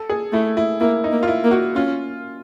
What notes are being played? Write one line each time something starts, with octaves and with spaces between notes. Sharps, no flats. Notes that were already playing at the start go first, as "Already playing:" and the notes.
Already playing: A4
G#4
A3 E4
E4
A#3 E4
D#4
A#3
F4
E4
A#3
F#4
C#4 F4